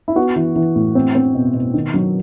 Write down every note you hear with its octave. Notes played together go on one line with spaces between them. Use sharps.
E4
B3 F#4
E3
E3
A2
C4
C4
B2
B2
D#3
F#3